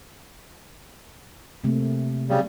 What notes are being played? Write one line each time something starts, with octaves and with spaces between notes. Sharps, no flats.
C3 A3 A#3 C4
C#3 F#3 G3